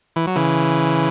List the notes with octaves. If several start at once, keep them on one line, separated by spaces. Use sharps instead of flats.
E3
F#3
C#3 E3